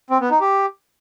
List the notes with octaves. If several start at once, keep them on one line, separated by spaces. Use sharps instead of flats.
C4
B3
D#4
G4